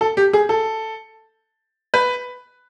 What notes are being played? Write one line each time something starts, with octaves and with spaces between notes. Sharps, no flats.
A4
G4
G#4
A4
B4